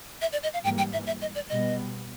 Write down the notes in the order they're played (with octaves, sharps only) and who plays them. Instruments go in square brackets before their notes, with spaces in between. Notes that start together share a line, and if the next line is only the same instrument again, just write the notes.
[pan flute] E5
D5
D#5
F5
[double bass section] G#2 E3 G3 A#3 [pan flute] G5
[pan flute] G5
E5
E5
D#5
D5
[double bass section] B2 G3 B3 [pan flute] D#5